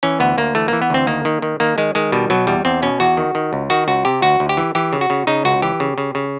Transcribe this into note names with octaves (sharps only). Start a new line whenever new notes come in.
E3 C#4
D2 B3
D2 A#3
E3 A3
E3 A#3
B3
D2 C4
D#3 A#3
D#3
D#3
D#3 A#3
D#3 G#3
D#3 G#3
B2 G3
B2 F#3
E2 G3
E2 C4
B2 C#4
E2 F#4
D#3
D#3
C#2
D#3 F#4
C#2 F#4
C3 G4
D2 F#4
D2
G4
E3
E3 G4
C#3
F#4
C#3
C#3 D#4
C#2 F#4
E3 G4
C#3
C#3
C#3